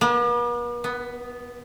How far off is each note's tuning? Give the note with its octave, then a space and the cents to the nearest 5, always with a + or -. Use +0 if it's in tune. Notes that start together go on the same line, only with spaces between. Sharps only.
B3 -45
B3 +5